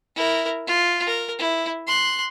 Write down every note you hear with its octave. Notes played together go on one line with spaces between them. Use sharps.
E4 A#4
F4
A#4
E4
C6 F#6